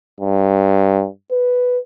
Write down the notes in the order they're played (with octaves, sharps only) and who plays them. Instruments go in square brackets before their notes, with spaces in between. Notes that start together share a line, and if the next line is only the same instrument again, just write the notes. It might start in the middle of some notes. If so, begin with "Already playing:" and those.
[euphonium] G2
B4